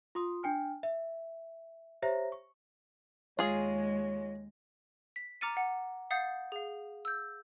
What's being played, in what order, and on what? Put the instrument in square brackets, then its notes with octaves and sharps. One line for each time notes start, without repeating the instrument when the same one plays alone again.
[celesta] F4 C6 D#6
D4 G5 G#5 F6
E5
G4 C5 C#5 E5 A#5 A#6
C#6
[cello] D#2 G#3 [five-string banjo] F4 G#4 [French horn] C#5
[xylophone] B6
A#5 D6 F6 A6 C#7 D#7
F#5
F5 F#5 D#6 G6 A6 C7
G#4 F5
E6 G6